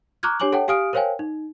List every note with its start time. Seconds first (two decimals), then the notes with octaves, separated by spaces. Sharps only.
0.23 A#5 C#6 D6 F6 F#6 G#6
0.40 D4 G4 C#5 G#5 D6 F#7
0.52 A4 C#5 F#5 G5 A5
0.68 G4 F5 G#5 D#6 F6 D7
0.93 A#4 C5 C#5 F5 G5 G#5
1.19 D#4